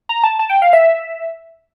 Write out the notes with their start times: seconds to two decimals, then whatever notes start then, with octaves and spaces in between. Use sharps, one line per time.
0.09 A#5
0.23 A5
0.39 A5
0.49 G5
0.62 F5
0.73 E5